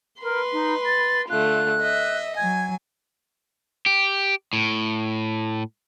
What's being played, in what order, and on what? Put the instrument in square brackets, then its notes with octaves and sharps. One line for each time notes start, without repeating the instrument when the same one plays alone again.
[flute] A#4 [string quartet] B4 B5 C6
[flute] D#4
A6
[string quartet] D3 A3 F4 [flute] F#6
[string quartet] D#5 E5
[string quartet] F#3 G#5 [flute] G#6
[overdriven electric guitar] G4
A2